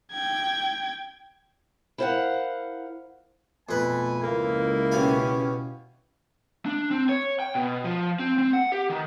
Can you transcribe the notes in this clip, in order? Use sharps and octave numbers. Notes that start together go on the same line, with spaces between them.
G5 G#6
E4 A#4 C5 D5 F5 F#5
F2 B2 A3 B4 G#5
C#2 A#3 E4
B2 C#4 G4 F5 G#5
D4
C4
C#5
G5
B2
F3
C4
C4
F#5
G4
D#3